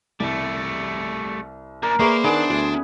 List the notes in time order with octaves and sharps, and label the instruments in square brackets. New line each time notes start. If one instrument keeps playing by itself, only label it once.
[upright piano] C2 [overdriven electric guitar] G3 A3
[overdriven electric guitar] A#3 D4 [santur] A#4
[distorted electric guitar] A#3 [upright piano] G#4 B4 C#6 [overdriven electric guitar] C5 [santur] D5 E5 B5
[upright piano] D#3 [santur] B3 G#4 [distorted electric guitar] D4 D5
[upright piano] D2